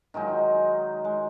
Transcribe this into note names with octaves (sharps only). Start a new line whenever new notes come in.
D#3 F#3 G#3 D#4
G#3